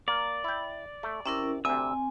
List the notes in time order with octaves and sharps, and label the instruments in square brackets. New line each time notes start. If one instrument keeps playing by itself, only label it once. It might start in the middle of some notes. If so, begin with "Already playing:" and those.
[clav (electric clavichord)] A#3 [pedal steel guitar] D5
[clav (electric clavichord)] E4 G5
A3
[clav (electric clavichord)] C3 [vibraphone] C#4 E4 A#4
[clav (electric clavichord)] D2 C3 [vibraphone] C4 G#5 [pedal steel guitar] E6